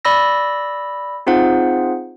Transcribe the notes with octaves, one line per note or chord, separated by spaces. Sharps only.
D5 B5 E6 A#6
C4 D#4 F4 G#4 C5 F#5